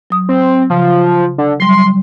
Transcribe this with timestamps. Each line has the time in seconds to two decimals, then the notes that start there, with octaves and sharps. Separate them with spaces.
0.10 F#3 D#6
0.29 C4
0.70 C#3 F3
1.38 D3
1.60 F#3 G3 C6